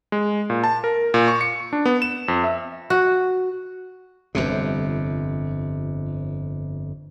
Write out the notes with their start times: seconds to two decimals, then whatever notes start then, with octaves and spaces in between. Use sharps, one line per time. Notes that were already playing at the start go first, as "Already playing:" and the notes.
0.12 G#3
0.50 A#2
0.64 A5
0.84 A#4
1.14 A#2
1.28 C#6
1.41 C#7
1.73 D4
1.85 B3
2.02 E7
2.28 F2
2.44 E5
2.90 F#4
4.35 G1 F2 C3